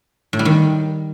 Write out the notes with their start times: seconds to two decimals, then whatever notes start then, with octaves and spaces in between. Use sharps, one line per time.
0.33 A2
0.39 G3
0.45 D#3